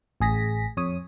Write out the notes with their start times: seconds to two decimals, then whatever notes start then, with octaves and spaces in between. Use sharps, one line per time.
0.20 A1 G#4 A#6 B6
0.77 F2 C#5 D#6